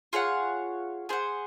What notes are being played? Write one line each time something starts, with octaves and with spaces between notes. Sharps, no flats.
F4 G#4 C#5 F#5
G#4 C5 F#5